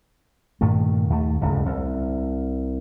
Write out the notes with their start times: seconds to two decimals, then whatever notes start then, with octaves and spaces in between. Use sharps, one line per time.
0.61 G2 A#2 D#3 A3
1.10 D#2 A3
1.41 D1 C#2 G2 C#3
1.66 C2